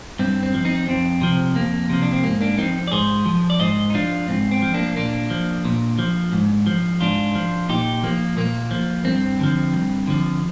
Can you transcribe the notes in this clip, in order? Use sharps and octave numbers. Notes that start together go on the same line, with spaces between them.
G2 C4
C4
F3
C4 D#4
F2 C4
C3 F3
F2 A#3
C3 F3
D4
C4
G#2 A#3
A#3 D4
F3 C4 D#4
D5
G#2 G#4 C5
F3
D5
G#2 C5 D#5
D#4
F3 D4 F4
G#2 C4
C4
F3
A#3 D4
A#2 A#3 D4
F3
A#2
F3
G#2
F3
G#2 D4 F4
F3
A#2 D#4 G4
F3 A#3
A#2 A#3
F3
G2 C4
D3 F3
G2
D3 F3